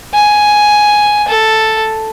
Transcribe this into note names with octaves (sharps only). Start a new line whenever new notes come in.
G#5
A4